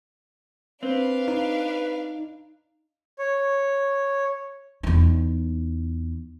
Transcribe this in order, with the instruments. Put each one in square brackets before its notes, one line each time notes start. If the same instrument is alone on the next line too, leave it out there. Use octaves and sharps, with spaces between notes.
[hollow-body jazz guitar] C4 [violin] D4 F5 [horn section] B4
[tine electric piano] D#4
[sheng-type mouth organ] C#5
[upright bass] E2 D#4